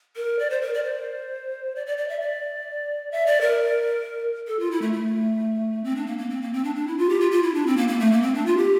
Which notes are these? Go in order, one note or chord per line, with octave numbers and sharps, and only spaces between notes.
A#4
D5
C5
A#4
D5
C5
D5
D5
D5
E5
D5
E5
D5
A#4
A4
F4
E4
A3
A3
C4
D4
A#3
A#3
C4
A#3
C4
D4
D4
E4
F4
G4
F4
F4
E4
D4
C4
A#3
A#3
A3
A#3
C4
D4
F4
G4